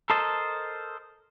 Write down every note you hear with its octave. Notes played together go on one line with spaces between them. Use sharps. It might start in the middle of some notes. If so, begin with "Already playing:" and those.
A4 A#4 C5 D#5 A5